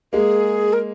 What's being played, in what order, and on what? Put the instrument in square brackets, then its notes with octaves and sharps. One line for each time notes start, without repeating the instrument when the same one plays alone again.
[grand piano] G#3 A#3 [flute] G#4
[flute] A#4